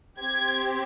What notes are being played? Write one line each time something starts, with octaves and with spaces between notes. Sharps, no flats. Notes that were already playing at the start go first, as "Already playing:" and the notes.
C4 G4 G#6